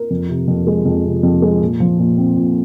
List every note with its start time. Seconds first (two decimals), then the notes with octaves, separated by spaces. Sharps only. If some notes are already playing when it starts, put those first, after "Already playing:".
Already playing: A#4
0.11 F2
0.29 C3
0.48 F2
0.67 G#3
0.86 F2
1.05 C3
1.23 F2
1.42 G#3
1.61 A#2
1.80 F3
1.99 A#2
2.18 C4
2.36 A#2